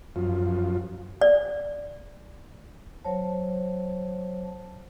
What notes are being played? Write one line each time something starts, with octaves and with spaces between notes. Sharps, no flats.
F#2 F3
D5
F#3 C5 C#5 A5